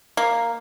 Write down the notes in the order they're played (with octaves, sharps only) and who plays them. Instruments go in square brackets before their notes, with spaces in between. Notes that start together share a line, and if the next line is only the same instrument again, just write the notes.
[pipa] A#3